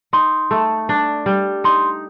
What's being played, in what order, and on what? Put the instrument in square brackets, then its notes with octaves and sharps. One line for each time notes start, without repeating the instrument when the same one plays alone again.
[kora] D#4 [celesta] C6
[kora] A3
D4
G3
[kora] D#4 [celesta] C6